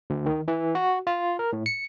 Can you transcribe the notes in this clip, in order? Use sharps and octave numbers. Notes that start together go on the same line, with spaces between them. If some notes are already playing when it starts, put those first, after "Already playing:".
D2
D#3
E3
F#4
F4
A#4
A2
C#7